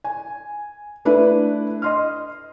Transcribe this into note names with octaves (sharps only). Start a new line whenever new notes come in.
G#5
A3 D4 E4 B4
D#5 C6 F6